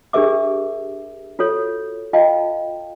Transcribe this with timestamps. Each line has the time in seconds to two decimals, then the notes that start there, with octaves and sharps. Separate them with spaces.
0.13 D4 G4 G#4 A#4 E5 D6
1.39 F4 F#4 A4 C#5
2.13 F4 D#5 F5 G5 A5